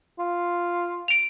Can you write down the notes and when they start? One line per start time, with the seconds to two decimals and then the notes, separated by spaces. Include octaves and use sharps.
0.19 F4
1.08 D7 F7